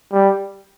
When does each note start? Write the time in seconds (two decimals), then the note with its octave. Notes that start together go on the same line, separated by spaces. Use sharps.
0.12 G3